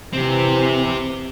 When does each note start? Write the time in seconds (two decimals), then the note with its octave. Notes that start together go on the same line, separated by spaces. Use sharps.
0.13 C3 E3 C4 G4